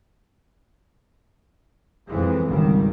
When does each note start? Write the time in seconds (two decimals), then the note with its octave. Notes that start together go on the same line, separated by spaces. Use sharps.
2.08 F2 E3 G#3
2.49 G#1 C#2 D#3 G3